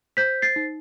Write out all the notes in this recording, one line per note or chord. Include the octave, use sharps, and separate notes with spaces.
C5 G6 B6
A6 C7
D#4